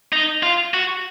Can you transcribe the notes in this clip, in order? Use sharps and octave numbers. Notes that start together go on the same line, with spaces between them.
D#4
F4
F#4